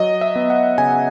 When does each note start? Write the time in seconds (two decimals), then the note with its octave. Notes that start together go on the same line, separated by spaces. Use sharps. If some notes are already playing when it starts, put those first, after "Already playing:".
Already playing: F#3 D#5
0.21 E5
0.36 B3
0.50 F#5
0.78 C#3 G#5